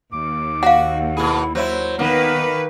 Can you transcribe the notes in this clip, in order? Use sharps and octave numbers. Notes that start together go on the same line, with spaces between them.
D#2 D6
F#4 F5 F#5
B2 E4 G#4
F#3 E4 C5
D#3 A#3 B3 B4